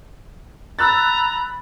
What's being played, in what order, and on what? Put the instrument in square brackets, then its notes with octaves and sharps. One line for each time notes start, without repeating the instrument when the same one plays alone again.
[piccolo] A#5 [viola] B5 [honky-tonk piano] E6 F#6 A6